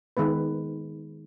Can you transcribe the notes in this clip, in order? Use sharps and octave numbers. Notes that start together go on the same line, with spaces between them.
D#3 G#3 B3 B4